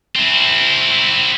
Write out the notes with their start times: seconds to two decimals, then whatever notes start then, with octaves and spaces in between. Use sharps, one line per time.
0.15 C4 E4